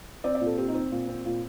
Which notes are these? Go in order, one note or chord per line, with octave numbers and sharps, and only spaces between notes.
C4 D5
D5
A#2
A4
C4 G4
D#4
C4
A#2
C4
A#2